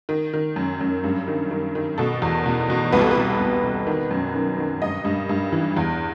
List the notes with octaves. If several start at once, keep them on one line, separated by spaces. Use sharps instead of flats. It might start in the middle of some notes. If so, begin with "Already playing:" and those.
D#3
D#3
F#2
F#2
G2
D#3
D#3
D#3
B2 A4
E2
B2
B2
C2 B4
A4
B4
B2
C2
B2
D#3
F#2
D#3
D#3
G2 D#5
G2
G2
E3
E2